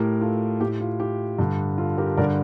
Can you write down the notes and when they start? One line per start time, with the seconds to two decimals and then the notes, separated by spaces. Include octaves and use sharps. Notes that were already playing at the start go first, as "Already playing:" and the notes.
Already playing: A2 G4 A#4
0.21 F4 A4
0.60 A2 G4
0.80 F4
1.00 G4
1.38 G2 D3
1.78 F4 A4
1.98 G4 A#4
2.17 G2 D3 A#4 D5